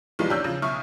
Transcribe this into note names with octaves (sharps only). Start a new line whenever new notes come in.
B1 E3 F3 G3 G#3
E2 D4 C#5 E6 G6
C#3 F3
B1 E5 C#6 D#6 F6